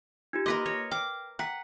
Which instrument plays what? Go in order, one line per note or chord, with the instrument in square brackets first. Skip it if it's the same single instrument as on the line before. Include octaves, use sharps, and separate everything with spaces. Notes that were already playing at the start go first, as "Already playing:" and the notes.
[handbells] D#4 F4 G4
[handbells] A#3 C6 D6 [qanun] A#4 B4 D#5
[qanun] C#5 [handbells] A#6
[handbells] G5 F6 [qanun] D6
[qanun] F#5 [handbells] G5 A#5 B6